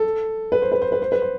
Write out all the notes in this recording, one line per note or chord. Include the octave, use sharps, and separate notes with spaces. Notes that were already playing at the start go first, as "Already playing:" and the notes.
Already playing: A4
B4
C5
B4
C5
B4
C5
B4
C5